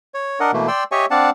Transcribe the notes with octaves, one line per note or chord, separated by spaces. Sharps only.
C#5
D4 A#4 D#5 F#5
B2 E3 A3 A#3
D5 G5 C6 E6
G4 C#5 D#5 E5 G#5 C#6
C4 D4 D5 F5 F#5 A5